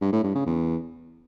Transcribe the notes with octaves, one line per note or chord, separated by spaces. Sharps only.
G2
A2
G2
C#3
E2